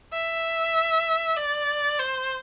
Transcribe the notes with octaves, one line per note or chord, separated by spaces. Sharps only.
E5
D5
C5